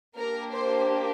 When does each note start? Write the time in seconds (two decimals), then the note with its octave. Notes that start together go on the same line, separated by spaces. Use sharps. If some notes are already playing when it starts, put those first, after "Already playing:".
0.17 A#3 D4 G4 A#4
0.54 C5